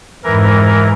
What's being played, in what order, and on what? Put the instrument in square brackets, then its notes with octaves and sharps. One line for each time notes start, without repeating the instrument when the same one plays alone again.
[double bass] F2 G#2 [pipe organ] E3 A#4